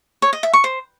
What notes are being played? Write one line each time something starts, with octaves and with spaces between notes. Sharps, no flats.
C#5
D#5
E5
C#6
C5